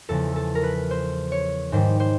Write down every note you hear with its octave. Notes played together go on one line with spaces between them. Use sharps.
E2 C#3 F3 A4
A4
A#4
B4
C5
C#5
G#2 D#3 G3 C5
C5